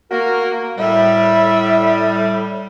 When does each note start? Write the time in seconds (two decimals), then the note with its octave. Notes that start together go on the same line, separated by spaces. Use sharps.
0.11 A#3 F#4 A#4
0.78 A2 G3 E5